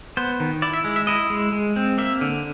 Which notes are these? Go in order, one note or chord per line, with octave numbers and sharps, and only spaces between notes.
B3 C5
D#3
E4 D5
E5
G#3
E5
E4 D#5
G#3
G#3
C4
A#3 E5
D3